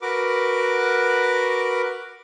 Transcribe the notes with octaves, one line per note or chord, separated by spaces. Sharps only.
F#4 A#4 B4 D6